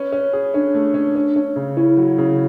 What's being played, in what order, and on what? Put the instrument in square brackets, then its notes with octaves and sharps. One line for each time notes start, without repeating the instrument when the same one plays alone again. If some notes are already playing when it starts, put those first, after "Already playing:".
Already playing: [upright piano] C#4 B4
C#4
G#4
[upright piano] C#4 [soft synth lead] D4
[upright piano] A3
C#4
C#4
C#4
C#3
[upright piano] C#4 [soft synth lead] E4
[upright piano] F#3
C#3